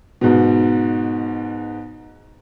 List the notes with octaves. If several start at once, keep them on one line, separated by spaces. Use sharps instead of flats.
G#2 B2